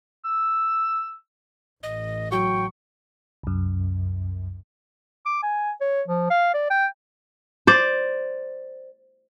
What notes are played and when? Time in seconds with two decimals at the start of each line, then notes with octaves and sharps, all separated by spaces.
0.25 E6
1.83 A1 D#5
2.32 F#3 G5 C#6
3.43 C2 F#2
5.26 D6
5.43 G#5
5.81 C#5
6.08 F3
6.31 F5
6.54 D5
6.70 G5
7.67 C5 D5